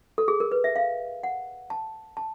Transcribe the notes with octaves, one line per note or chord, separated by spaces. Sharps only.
A4
G#4
A#4
B4
E5
F5
F#5
A5
A5